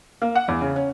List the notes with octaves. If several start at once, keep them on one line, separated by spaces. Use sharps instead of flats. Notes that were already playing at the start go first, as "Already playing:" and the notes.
A#3
F#5
E2
C#3
C#4